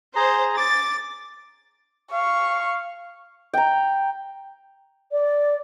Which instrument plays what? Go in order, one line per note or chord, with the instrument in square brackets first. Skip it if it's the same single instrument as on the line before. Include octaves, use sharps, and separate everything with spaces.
[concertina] G#4 A#5 [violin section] C5
[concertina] D6 [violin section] A6
[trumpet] F5 [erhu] C#6
[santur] G5 A#5
[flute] D5